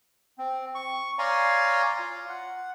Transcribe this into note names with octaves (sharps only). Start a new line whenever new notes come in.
C4
C#6
C#5 D5 F5 G#5 A#5 C6
F4
F#5